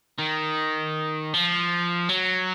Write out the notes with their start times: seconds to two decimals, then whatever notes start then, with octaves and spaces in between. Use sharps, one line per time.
0.19 D#3
1.34 F3
2.09 F#3